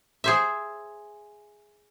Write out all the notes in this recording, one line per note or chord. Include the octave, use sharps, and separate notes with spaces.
G#4 C5 E5